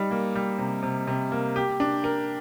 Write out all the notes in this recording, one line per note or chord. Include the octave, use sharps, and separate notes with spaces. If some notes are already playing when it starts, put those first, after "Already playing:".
Already playing: G3 D#4
A#3
G3
C3
C3
C3
A#3
G4
D4
A#4